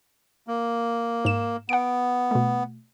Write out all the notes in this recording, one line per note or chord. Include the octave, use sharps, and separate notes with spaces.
A#3
G#2 E7
B3 F#5 D7
B2 A3